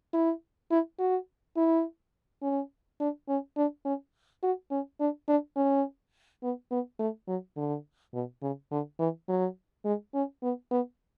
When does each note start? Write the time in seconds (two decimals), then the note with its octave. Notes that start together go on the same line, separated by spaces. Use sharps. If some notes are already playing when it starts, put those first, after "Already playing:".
0.14 E4
0.71 E4
0.99 F#4
1.57 E4
2.43 C#4
3.00 D4
3.29 C#4
3.57 D4
3.85 C#4
4.43 F#4
4.71 C#4
5.00 D4
5.28 D4
5.56 C#4
6.43 B3
6.71 B3
6.99 A3
7.28 F#3
7.57 D3
8.14 B2
8.42 C#3
8.71 D3
8.99 E3
9.29 F#3
9.85 G#3
10.14 C#4
10.43 B3
10.71 B3